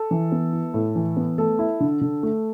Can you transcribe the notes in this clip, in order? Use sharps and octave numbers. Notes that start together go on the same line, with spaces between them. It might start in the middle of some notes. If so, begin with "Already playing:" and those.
Already playing: A4
E3
B3
E4
A2
E3
B3
A3 A4
E4
D3
D3
A3